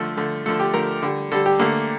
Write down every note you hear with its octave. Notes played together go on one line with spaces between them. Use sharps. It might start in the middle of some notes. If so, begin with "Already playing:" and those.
Already playing: D3 F3 A3 A4
D3 F3 A3
D3 F3 A3 A4
G4
D3 F3 A3 A#4
D3 G3
D3 G3 A4
G4
D3 A3 A#3